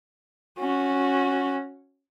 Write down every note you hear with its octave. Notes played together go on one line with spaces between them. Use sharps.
C#4 F#4